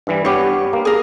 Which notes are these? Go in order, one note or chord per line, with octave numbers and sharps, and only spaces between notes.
G2 E3 G3
G2 B3 G4 C#5
A#3
G#4 A#4